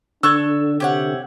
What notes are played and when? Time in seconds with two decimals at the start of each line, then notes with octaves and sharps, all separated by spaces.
0.23 D3 D4 A4 C#6 E6 F#6 G#6
0.80 C3 G4 C#5 F#5